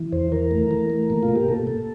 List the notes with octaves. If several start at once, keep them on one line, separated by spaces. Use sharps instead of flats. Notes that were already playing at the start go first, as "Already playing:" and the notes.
Already playing: E3
E2 C5
E3 A#4
A3
E3
A3
A#2
F4
A#2
G4
A#2 A4
A#2